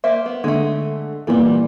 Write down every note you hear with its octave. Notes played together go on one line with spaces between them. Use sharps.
A#3 C5 E5
B3
D3 G#3 A3
A#2 E3 G3 A#3 B3